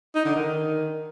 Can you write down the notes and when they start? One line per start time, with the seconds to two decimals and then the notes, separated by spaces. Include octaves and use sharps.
0.15 D#4
0.25 D3
0.35 D#3